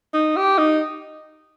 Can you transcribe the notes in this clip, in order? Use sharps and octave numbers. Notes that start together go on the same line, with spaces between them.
D#4
G4
D#4